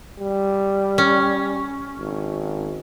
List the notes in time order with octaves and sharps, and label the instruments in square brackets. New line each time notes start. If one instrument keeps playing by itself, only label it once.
[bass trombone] G3
[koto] C#4
[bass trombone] G#1